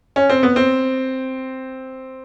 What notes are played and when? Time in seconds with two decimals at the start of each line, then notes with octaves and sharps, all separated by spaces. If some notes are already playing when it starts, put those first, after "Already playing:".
0.16 C#4
0.29 C4
0.43 B3
0.56 C4